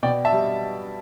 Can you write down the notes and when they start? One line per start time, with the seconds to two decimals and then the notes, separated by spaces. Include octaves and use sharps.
0.03 B2 D5 G5
0.25 E5 A5
0.32 G3